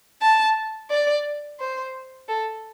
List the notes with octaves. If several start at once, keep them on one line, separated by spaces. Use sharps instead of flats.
A5
D5
C5
A4